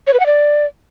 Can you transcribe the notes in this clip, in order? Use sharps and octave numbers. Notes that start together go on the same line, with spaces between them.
C#5
B4
F#5
D5